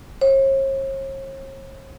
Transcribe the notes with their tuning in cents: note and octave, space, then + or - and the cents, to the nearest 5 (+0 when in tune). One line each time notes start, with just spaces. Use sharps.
C#5 -45